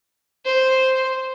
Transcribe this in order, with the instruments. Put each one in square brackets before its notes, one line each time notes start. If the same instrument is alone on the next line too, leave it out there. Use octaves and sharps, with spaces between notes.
[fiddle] C5